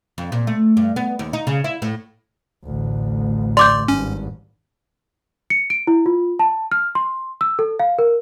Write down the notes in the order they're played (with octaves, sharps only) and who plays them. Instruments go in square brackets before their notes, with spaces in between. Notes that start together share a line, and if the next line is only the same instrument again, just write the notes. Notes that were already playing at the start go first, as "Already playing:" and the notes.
[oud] F2
A#2
A3
G2
B3
D#2
D#4
C#3
E4
A2
[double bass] A1 D2
[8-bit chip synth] D5 [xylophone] C6 D6 G6
[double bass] G#1 G2 [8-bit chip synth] C#4
[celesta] C#7
D7
E4
F4
A5
F6
C6
E6
A4
F5
A#4